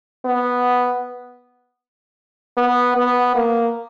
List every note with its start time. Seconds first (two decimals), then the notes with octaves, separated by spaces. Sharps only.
0.25 B3
2.57 B3
2.97 B3
3.35 A#3